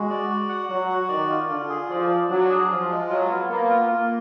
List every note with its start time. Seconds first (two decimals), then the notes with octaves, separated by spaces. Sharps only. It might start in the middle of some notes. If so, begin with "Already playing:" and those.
Already playing: G#3 F#4
0.10 D5
0.30 F#4
0.49 F#5
0.69 F#3 F#4
0.89 F#4
1.09 D#3 D5
1.29 F4
1.49 D3 F4
1.69 G#4
1.90 F3 D5
2.09 D5
2.29 F#3 D4
2.49 G#4
2.69 F3 F4
2.90 G#3
3.09 F#3 F4
3.30 B3
3.50 A#3 B3
3.69 F4
3.90 A#3 F4